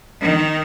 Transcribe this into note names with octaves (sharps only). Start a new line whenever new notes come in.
D#3